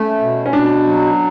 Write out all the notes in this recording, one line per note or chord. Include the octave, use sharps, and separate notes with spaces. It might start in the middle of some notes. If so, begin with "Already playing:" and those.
Already playing: A3 C#4
B2
C#4
B2 D4
F#3